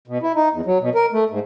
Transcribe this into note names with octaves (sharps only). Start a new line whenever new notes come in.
B2
E4
D#4
E2
F#3
B2
A#4
A3
G#2